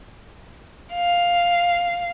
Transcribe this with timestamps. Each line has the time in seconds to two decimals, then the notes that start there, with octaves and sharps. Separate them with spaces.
0.93 F5